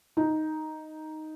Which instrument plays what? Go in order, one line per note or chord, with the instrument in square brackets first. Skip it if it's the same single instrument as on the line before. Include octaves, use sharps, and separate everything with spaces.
[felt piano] D#4